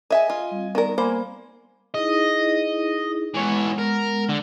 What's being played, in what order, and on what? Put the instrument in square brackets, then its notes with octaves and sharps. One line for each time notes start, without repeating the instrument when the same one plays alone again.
[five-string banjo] G#4 E5 [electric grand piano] D#5 G#5
[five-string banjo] F4
[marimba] G3 C4
[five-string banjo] D#3 A#4 [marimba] B3 D5
[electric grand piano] A#3 G#5 [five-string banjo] C5 [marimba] B5 D6
[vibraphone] D#4 E4 G#4 [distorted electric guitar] D#5
[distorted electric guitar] E3 C#5 [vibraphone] G#3 B3 F#5
[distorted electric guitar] A#4
D3